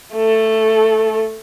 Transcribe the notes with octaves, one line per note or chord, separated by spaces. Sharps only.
A3 A4